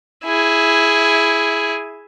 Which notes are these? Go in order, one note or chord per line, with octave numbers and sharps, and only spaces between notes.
E4 G#4